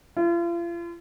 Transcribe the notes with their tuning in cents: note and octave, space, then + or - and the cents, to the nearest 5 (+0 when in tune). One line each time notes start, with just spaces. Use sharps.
F4 -40